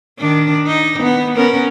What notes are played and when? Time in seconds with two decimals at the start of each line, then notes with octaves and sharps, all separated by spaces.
0.19 D#3 D4
0.67 D#4
1.02 B3
1.36 B3 C#4 A#4